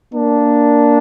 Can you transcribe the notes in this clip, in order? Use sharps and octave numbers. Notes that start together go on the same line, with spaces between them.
A#3 D4